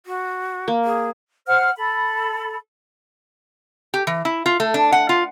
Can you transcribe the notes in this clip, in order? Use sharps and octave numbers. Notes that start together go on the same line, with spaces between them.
F#4
A#3
G#4
C5 F#5 F6
A4 B5
G4
E3
E4
F4
A3
D4
F#5
F4